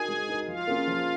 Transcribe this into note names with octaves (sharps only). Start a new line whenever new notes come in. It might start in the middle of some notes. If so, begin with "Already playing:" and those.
Already playing: D#4 F#4 G#4 A#4 G#5
G#3
D#4 F#4 A#4
F3 F4 F5
A#3 C#4 G#4
F3